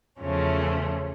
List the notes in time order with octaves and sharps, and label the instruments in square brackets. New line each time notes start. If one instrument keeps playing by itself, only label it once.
[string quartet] E2 C#3 F3 A3 C#4